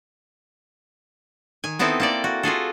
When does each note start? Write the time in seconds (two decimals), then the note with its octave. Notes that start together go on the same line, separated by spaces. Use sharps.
1.64 D#3 G#5
1.79 B3 C4 D#4 E4 A4
2.00 A#3 A4 D5
2.24 F#4
2.43 F4 F#4 G#4 A4